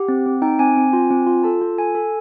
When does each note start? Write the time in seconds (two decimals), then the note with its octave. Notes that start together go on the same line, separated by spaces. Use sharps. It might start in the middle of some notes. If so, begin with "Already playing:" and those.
Already playing: G4 F#5
0.08 C4
0.26 C4
0.42 D#4 G5
0.59 C4 G#5
0.77 C4
0.93 F4
1.11 C4
1.26 F4
1.43 A4 A5
1.62 F4
1.78 A4 G#5
1.95 A4